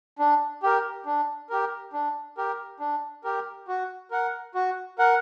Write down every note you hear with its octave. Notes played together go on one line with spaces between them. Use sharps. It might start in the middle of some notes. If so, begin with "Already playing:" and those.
D4
G4 A#4
D4
G4 A#4
D4
G4 A#4
D4
G4 A#4
F#4
A#4 F#5
F#4
A#4 F#5